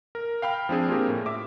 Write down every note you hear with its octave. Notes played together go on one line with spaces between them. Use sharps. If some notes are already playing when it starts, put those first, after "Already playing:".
A#4
F5 G5 B5 F6
F3 C4 D4 G#4
A#3 C4 F4 G4 G#4 A#4
A2
E5 D6